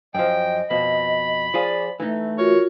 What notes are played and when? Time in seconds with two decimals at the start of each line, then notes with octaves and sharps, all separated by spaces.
0.15 F#2 F3 D#5 G5
0.70 F2 B2 B5
1.54 F3 F4 G#4 D5
2.00 E3 A3 D#4
2.38 F4 F#4 A#4 C#5